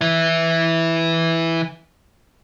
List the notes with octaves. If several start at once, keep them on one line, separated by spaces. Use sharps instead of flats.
E3 E4